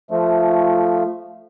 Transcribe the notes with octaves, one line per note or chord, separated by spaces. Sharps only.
F3 A3